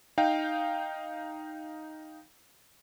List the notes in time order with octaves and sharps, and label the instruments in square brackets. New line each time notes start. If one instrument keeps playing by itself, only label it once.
[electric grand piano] D#4 F5 G5